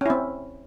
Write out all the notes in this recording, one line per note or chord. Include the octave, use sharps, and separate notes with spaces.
C4 C#4 E4